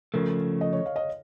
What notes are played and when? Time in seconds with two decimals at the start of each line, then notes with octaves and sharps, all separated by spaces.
0.14 C#3 F3 A3 A#4
0.61 D#5
0.73 C#5
0.86 F5
0.96 D#5